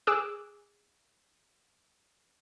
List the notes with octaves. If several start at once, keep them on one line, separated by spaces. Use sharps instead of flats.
G#4 D6 E6 F#6